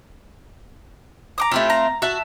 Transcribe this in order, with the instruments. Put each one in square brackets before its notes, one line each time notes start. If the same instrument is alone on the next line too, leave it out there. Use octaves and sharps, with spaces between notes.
[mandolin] A#5 D6 D#6
[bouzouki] A3 C4 F4 [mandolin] E4 G4
[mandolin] A#5
[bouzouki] F#4 [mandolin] E5 A5 F#6